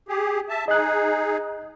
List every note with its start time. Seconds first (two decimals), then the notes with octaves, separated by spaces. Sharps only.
0.08 G4 G#4
0.49 E5 A5
0.68 D#4 G#4 D#5 F#6